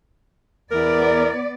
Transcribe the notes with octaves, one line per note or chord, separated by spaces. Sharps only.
E2 B3 E4 A#4 D5